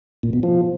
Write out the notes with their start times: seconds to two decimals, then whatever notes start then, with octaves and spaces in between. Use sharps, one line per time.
0.23 A#2
0.33 B2
0.43 F3